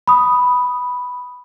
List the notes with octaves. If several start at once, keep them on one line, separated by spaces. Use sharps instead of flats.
B5 D#6